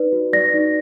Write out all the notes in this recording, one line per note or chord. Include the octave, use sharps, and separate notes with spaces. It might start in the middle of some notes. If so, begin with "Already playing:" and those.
Already playing: D#4 B4 D5
F#4
D5 A#6
D#4